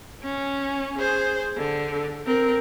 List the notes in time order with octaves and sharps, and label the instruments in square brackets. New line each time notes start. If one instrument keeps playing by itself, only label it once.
[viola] C#4
G#4 C5
D3
C4 A#4